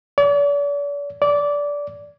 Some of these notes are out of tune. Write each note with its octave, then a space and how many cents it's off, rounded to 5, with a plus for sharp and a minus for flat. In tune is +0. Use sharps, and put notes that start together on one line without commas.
D5 -45
D5 -20